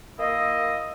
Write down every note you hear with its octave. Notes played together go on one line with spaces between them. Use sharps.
A#3 E4 D#5